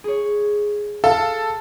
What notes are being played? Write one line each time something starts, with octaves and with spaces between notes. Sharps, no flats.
G#4 C#5
A4 F5 A5